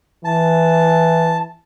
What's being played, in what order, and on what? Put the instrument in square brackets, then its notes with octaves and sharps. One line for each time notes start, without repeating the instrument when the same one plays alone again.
[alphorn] E3 [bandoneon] A5